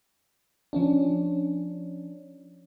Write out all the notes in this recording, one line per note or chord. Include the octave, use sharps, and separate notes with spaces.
F3 C#4 D4